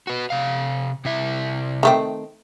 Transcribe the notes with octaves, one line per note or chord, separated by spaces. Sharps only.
F#4 B4
C3 F5
C3 E4 E5
D#3 A3 C4